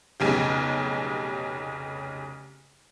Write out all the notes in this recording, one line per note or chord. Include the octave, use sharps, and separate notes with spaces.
F1 B1 C#3 G4